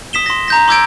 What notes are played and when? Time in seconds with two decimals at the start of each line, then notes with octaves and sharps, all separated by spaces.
0.13 D#6 B6 E7 G7
0.26 C6 A#6
0.48 A#5 G6 A#6
0.68 C6 D6 E6 G6 G#6 D7